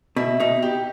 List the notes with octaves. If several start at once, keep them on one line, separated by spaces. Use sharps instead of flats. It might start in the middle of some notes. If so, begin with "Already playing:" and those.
B2 E4
B2 D#4
G4